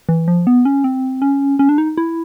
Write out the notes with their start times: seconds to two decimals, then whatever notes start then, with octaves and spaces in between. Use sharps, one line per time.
0.09 E3
0.28 F3
0.47 B3
0.65 C#4
0.84 C4
1.22 C#4
1.59 C#4
1.69 D4
1.78 D#4
1.97 E4